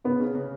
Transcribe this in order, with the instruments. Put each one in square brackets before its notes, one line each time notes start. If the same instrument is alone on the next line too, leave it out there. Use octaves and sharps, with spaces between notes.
[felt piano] C#3 [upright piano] B3
[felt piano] C#3
C#3